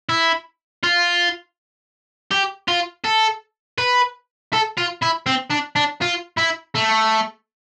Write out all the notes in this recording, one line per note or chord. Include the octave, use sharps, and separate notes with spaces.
E4
F4
G4
F4
A4
B4
A4
F4
E4
C4
D4
D4
F4
E4
A3